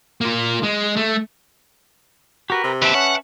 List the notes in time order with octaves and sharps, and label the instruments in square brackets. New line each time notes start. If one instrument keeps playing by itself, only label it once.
[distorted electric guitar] A#3 F4
G#3
A3
[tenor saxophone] F#4 [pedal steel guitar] G4 A#4 B4
[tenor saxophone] C3
[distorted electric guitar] D#2 C4 [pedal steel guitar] B4 E5 A5
[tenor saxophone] C#4 [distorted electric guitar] F#5